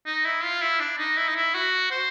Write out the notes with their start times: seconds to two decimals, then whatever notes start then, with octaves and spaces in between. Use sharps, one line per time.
0.06 D#4
0.25 E4
0.43 F4
0.61 E4
0.80 D4
0.98 D#4
1.17 E4
1.28 D#4
1.36 E4
1.55 F#4
1.91 C5